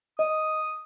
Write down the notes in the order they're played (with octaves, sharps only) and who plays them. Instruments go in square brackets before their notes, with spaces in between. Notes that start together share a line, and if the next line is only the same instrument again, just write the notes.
[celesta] D#5 [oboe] D#6